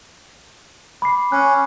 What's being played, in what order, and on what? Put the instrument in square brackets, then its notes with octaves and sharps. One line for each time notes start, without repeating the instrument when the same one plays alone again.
[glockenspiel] B5 D6 C7
[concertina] C#4 [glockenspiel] F#6